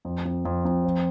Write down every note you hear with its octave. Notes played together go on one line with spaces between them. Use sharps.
F2
F2
F2
F2
F3